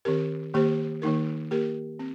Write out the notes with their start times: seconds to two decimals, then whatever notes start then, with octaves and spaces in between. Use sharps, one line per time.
0.05 D#3 C4 G4 A#4
0.54 D#3 A#3 G4 C5
1.02 D#3 A#3 D#4 A#4
1.51 A#3 G4 A#4
1.99 C4